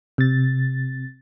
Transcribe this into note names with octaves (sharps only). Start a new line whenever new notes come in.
C3 A6